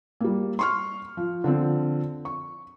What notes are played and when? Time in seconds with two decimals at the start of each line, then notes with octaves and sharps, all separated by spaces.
0.21 G3 A#3
0.59 C6 C#6 F6
1.17 F3
1.44 D3 F3 C4
2.25 C#6